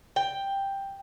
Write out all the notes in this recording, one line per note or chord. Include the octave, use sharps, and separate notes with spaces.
G5